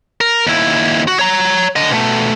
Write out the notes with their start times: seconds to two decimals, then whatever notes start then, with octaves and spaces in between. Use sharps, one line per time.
0.21 A#4
0.47 D#2 E4
1.08 F#4
1.19 C#5 A#5
1.76 D3 D#5
1.91 B2 A3